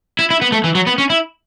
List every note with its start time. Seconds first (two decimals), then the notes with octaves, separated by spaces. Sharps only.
0.19 E4
0.31 E4
0.42 B3
0.52 A3
0.64 E3
0.75 F#3
0.87 B3
0.98 C#4
1.10 E4